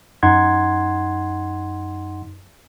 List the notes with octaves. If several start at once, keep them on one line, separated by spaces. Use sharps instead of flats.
F#2 D#4 F#5 C6 G#6